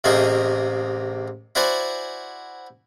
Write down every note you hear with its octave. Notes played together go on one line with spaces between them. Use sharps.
A1 C3 A3 A#3 D#4 G#4
E4 F#4 C5 D5 F#5 G#5